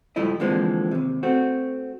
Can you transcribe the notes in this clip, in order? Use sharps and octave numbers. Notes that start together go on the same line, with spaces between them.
C#2 G2 F3 A3 E4 D#5
D3 E3 F3 G#3 A#3 C4
D#2 C3
A3 C4 F#4